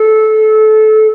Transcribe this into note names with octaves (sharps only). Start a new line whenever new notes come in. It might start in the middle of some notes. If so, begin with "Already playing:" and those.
Already playing: A4